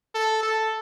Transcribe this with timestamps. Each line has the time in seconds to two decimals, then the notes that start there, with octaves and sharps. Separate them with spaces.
0.15 A4
0.43 A4